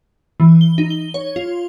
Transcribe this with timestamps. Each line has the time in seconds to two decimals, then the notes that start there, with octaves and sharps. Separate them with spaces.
0.40 E3
0.61 G7
0.78 D#4
0.90 G7
1.14 C#5
1.36 F4